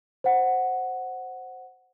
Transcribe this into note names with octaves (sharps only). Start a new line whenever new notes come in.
C5 F#5